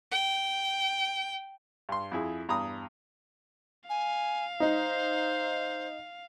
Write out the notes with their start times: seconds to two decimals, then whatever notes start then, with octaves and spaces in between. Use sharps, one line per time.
0.12 G5
1.89 G2 C6
2.12 F2 E4 G#4
2.48 E2 G2 A#5 B5 D#6
3.90 F5 G#5
4.60 D#4 C5